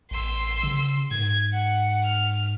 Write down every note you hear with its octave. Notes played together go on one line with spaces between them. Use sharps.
A1 C6 E6
C#3
G#2 G#6
F#5
F6